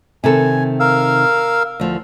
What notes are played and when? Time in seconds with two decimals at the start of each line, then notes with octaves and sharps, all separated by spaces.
0.24 C3 D#3 A4 G#5
0.80 A#4 F5 E6
1.80 D2 F3